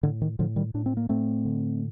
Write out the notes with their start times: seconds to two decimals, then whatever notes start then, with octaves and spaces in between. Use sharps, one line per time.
0.03 A2 D3
0.22 D#3
0.39 A2 D3 F3
0.56 D#3 G3
0.74 A2 D4
0.86 C4
0.97 A#3
1.09 A2 A3 C4
1.45 D3